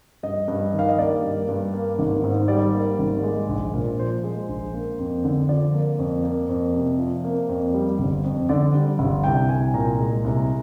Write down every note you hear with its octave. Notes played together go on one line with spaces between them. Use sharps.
G2 D#5
G2
D#3
F5
D#5
A#3 D5
G2
G2
A#3
G#1
G#2
G3 D5
A#3
G#1
G#3
A#1
A#2
F3 C5
G#3
A#1
A#3
F2
D3
F3 D5
A#3
F2
A#3
F2
C3
F3
A#3
F2
G3
G1
F2
D3 D5
G3
G1
C2 G5
C2 G#5
A#2 A#5
G#3
C2